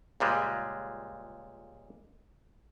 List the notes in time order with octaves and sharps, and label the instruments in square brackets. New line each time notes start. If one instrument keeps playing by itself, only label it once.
[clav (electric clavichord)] C#2 A#2 G3 G#3